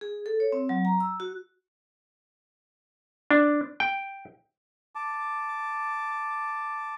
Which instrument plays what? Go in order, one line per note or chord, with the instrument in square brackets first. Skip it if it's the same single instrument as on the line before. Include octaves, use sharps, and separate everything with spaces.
[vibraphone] G#4
A4
C#5
C4
F#3
A#5
E6
F#4
[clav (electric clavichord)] D4
G5
[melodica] A5 D6